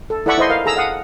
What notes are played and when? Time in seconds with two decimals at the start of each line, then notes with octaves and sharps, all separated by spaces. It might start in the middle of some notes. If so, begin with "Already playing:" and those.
0.10 A4
0.26 E4 A4 D5 F#5 B5 C#6
0.38 E4 C5 D#5 C6
0.50 A#4 F5
0.65 G#4 A4 A#5 E6
0.77 F5 F#5 D#6